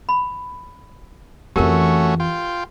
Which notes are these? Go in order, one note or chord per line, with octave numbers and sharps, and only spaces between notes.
B5
F2 E3 A3 C#4 F#4 G4 A#4
F4 G5